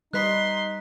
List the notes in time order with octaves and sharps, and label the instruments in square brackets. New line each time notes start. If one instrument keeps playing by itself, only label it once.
[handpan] G3 B4 D#5 [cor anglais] D#4 [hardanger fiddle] C6 [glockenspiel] F#6 B6